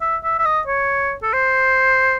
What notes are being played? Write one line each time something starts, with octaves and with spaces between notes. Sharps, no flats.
E5
E5
E5
D#5
C#5
A4
C5